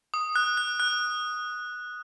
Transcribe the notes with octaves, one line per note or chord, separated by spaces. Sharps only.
D#6
F#6
F#6
F#6